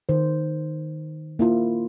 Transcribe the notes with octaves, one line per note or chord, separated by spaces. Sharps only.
D#3 C5
A#3 E4 F4